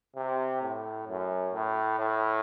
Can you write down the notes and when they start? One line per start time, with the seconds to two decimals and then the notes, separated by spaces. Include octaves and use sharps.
0.16 C3
0.62 A2
1.07 F#2
1.53 A2
1.99 A2